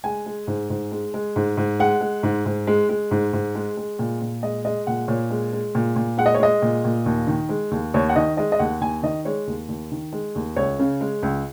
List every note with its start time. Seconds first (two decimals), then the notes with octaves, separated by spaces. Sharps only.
0.04 G#3 G#5
0.26 G#3
0.47 G#2
0.70 G#2
0.92 G#3
1.14 G#3
1.36 G#2
1.57 G#2
1.80 G#3 F#5
2.01 G#3
2.23 G#2
2.45 G#2
2.67 G#3
2.89 G#3
3.11 G#2
3.33 G#2
3.55 G#3
3.77 G#3
3.99 A#2
4.21 A#2
4.43 G#3 D#5
4.65 G#3 D#5
4.87 A#2 F#5
5.08 A#2 C#5
5.30 G#3
5.53 G#3
5.75 A#2
5.96 A#2
6.18 G#3 F#5
6.26 D#5
6.34 C#5
6.40 G#3 D#5
6.62 A#2
6.84 A#2
7.06 D#2
7.27 D#3
7.49 G#3
7.71 D#2
7.94 D#2 C#5
8.09 F#5
8.16 D#3 D#5
8.37 G#3 D#5
8.52 D#5
8.59 D#2 F#5
8.81 D#2 G#5
9.03 D#3 D#5
9.25 G#3 C#5
9.47 D#2
9.68 D#2
9.92 D#3
10.12 G#3
10.35 D#2
10.57 C#2 C#5
10.79 C#3
11.01 G#3
11.23 C#2